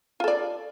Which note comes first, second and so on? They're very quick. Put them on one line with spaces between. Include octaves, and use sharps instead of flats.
F4 A4 D5